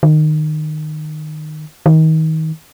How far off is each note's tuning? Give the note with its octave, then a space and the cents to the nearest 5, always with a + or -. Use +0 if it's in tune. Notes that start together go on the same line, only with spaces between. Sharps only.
D#3 -20
D#3 +30